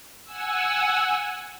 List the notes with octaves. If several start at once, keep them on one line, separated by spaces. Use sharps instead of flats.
F#5 G#5 E6